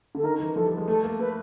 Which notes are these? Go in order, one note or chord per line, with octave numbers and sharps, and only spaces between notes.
D3 A4
D#3 A#4
E3
F3 A4
G3
G#3
A3 A4
A#3
A3 B4